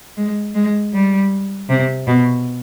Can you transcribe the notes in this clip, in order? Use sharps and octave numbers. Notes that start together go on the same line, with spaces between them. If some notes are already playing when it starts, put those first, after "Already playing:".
G#3
G#3
G3
C3
B2